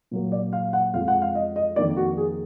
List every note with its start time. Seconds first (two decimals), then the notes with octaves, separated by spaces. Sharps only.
0.11 A#2 F#3 A#3
0.32 D5
0.53 F5
0.73 F#5
0.94 F2 F3 G#3 F5
1.08 F#5
1.22 F5
1.35 D#5
1.56 D#5
1.76 F2 D#3 A#3 D5
1.97 F#4
2.17 G#4